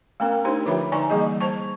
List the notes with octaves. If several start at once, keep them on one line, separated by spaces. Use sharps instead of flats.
A3 B3 C#4 A#4
D4 D#4 G4 C5
D3 F3 F4 C#5 E5 B5
D3 D#4 D5 G#5 A#5 C#6
E3 G3 A#3 G#4 D#5
C5 A5 C#6